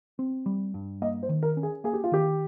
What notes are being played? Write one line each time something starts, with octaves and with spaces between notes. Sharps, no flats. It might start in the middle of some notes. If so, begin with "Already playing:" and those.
C4
G3
G2
A#3 D#5
C5
D#3
A#4
C#4
G#4
A#3 G#4
G4
F4
D#3 G4